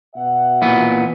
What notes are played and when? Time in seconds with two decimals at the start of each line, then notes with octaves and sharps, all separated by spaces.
0.15 B2 E5 F#5
0.62 A#2 E3 B3